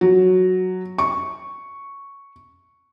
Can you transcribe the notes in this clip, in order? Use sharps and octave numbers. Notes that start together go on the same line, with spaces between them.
F#3
C#6